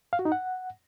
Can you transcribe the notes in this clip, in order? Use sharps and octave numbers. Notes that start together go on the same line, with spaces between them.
F5
F#4
D#4
F#5